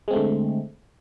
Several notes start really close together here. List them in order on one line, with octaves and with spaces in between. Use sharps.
G#3 C4 A3 D3